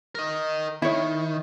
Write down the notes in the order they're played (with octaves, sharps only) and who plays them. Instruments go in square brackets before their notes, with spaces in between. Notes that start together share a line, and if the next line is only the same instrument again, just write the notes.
[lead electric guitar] A#4 D#5
[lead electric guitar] D#3 [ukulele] E4 C#5